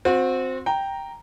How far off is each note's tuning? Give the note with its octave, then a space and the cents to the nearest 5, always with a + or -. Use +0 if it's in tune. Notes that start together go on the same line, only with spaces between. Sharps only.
C4 +0 F#4 -35
G5 +0 A#5 +0